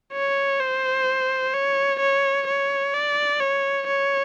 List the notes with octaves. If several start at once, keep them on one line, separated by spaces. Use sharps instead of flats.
C#5
C5
C#5
C#5
C#5
D5
C#5
C#5